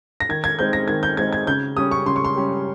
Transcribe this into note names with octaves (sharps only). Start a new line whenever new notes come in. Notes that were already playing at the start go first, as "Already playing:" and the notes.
A#6
D#3 G#6
G#6
G#3 C4 D#4 G6
A#6
D#3 G#6
G6
G#3 C4 D#4 G#6
G#6
C#3 G6
G3 C#4 D#6
C#6
C#3 C6
C#6
C6
G3 C#4